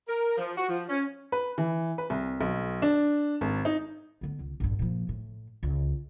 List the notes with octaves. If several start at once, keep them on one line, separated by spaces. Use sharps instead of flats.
A#4
F3
F#4
F3
C#4
B4
E3
B4
C2
B1
D4
G#1
D#4
D3 B3
C#2
A#1 G2
A#2 F3
A2
C#2